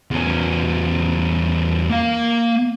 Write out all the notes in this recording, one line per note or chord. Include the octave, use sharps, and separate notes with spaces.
E2 C#4
A#3 F5